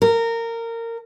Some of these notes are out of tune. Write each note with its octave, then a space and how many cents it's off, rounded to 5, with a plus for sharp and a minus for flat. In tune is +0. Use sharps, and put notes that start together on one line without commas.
A#4 -20